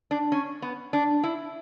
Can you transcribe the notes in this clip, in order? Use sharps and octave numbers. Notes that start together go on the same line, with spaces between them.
D4
C#4
B3
D4
E4